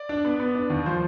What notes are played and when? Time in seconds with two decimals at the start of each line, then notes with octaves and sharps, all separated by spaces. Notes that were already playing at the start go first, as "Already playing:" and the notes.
Already playing: D5
0.09 D4
0.25 B3
0.40 B3
0.55 D4
0.70 D#2
0.86 F3 C5